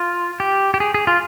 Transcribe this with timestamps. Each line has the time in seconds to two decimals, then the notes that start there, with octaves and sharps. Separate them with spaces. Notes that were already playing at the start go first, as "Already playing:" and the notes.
Already playing: F4
0.40 G4
0.74 G4
0.80 G#4
0.94 G#4
1.07 F4